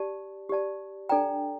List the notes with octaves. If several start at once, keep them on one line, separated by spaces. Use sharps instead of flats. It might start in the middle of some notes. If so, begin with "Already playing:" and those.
Already playing: G4 D5 A5
G4 D5 A5
D4 A4 D5 G5 A#5